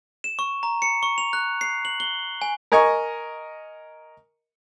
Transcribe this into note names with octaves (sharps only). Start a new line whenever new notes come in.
E7
C#6
A#5
C#7
C#6
F7
F#6
C7
F#7
G7
G#5
A#4 D#5 G#5 A#5 C#6